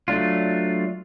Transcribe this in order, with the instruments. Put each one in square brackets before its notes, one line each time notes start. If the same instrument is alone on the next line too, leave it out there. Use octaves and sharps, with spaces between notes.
[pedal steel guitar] F#3 A3 D4 F4